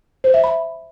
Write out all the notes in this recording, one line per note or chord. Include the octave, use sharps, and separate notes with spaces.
C5
E5
B5